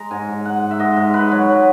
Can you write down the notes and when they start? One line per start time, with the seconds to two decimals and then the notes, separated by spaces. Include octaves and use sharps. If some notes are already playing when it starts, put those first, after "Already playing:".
Already playing: G#3 A#5
0.11 G#2 G#5
0.28 G#2
0.45 G#2 F#5
0.62 G#2
0.71 E5
0.79 G#2 D#5
0.97 G#2
1.14 G#2 B4
1.31 F#3 C#5
1.49 F#3